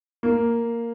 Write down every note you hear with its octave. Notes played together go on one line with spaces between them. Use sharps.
A#3